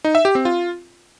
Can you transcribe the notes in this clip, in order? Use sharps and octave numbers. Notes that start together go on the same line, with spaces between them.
D#4
E5
G4
C4
F4